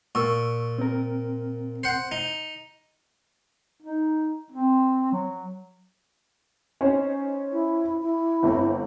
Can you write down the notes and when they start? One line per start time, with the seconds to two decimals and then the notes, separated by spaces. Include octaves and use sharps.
0.15 A#2 C#6 E6
0.78 C4 A#4
1.84 C5 F#5
2.12 D#4
3.83 D#4
4.52 C4
5.12 F#3
6.81 C#4 D#4 C5
7.52 E4
8.02 E4
8.43 G1 A3 C4